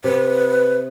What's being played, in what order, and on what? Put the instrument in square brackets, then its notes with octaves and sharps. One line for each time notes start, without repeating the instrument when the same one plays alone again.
[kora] C3 [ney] B4